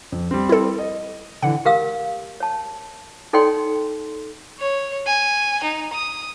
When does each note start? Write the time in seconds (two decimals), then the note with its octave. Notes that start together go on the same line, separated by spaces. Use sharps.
0.12 F2
0.31 G3 C4
0.49 E4 A4
0.79 D#5
1.42 D3 E3 F#5
1.65 G4 A#4 F5 E6
2.40 C#5 A5
3.33 D#4 A4 C#5 D5 G5 C6
4.59 C#5
5.06 G#5
5.63 D#4
5.93 D#6